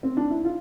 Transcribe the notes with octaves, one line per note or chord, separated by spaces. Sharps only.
C4
D4
E4
F4